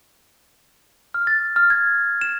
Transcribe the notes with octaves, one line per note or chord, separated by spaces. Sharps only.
F6
A6
F6
G#6
E7